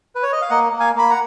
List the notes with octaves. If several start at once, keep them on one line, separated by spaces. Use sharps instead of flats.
B4
C#5
D#5
F5
A#3 D#5 F#5
A#3
F5 G#5
A#3 B5
F#5 A#5